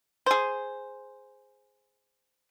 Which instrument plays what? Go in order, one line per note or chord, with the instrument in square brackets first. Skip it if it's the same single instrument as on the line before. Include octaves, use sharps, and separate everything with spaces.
[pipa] G#4 C5